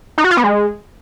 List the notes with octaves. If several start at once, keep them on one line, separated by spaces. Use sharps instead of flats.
D#4
F#4
F4
B3
G#3